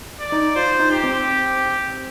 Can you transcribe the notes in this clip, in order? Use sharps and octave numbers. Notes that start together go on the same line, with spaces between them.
D5
D#4
F4 C5
D#4
G4
C4